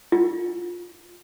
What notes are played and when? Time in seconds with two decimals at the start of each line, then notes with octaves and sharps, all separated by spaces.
0.12 F4